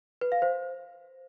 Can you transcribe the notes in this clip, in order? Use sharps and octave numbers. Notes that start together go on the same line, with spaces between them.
B4
F5
C5